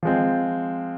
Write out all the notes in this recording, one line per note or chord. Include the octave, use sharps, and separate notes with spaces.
F3 G#3 C4